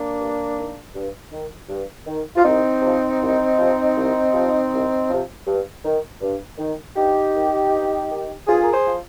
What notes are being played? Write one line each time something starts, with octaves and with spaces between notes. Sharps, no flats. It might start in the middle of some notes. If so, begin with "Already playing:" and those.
Already playing: A#3 D4
G2
D#3
G2
D#3
G2
D#3
F4
C2 C4 D#4
C3 F3
C2
C3 F3
C2
C3 F3
C2
C3 F3
G2
D#3
G2
D#3
G2 D#4 G4
D#3
G2
D#3
G2 F4 G#4
A#4
G#4 C5
F3